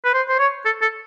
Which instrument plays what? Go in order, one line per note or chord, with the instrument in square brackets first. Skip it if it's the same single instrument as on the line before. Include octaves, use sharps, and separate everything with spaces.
[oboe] B4
C5
C5
C#5
A4
A4